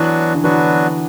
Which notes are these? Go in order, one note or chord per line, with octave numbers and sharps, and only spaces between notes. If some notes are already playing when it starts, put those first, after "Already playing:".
Already playing: E3 F#3 B3 D4 F#4 B4
D3
E3 F#3 B3 D4 F#4 B4